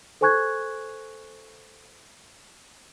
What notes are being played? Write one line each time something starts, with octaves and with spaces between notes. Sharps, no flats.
A4 C5 G#5 C#6 F#6 G#6